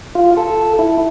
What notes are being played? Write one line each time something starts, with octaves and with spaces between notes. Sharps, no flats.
F4
A4
E4